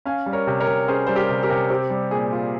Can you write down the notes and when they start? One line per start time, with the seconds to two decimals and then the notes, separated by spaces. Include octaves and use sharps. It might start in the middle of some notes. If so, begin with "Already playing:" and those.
0.05 C#4 F5 G#5
0.26 G3
0.33 A#4 C#5
0.47 C3
0.60 A#4 C#5
0.67 C3
0.88 C#4 G#4 C5
1.07 G3 C5
1.16 G4 A#4
1.29 C3
1.43 G4 A#4
1.50 C3
1.70 C4 G4
1.90 G3
2.11 A#2 G#4
2.32 F4